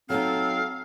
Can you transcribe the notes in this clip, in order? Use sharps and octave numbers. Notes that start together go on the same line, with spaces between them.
F#3 C4 D#4 A4 F5